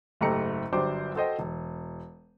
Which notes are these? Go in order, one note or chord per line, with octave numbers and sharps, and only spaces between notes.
F#1 G#2 A3 G4 A#5 C#7
G1 F#3 D4 G4 C5 D6
F#4 A4 C5 D#5 G5
E1